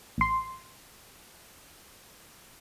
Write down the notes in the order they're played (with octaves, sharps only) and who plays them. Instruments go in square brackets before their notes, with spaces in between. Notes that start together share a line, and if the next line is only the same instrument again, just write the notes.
[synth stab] A1 C6